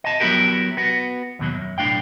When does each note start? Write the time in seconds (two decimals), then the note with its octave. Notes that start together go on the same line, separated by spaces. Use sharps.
0.04 D#5 A5
0.20 F#3 B3 E4 F#4 G4 A#4
0.77 B3 F#4
1.39 D#2 B2 F#3
1.54 F#2
1.78 B1 A2 C4 D4 F5 G5